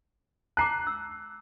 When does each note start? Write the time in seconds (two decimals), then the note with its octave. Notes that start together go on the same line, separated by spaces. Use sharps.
0.57 A5 A#5 D6 F#6 C7
0.87 E6